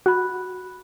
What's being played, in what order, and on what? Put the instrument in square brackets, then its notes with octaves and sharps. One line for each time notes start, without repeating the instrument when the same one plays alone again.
[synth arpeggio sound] F#4 [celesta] B5 F#6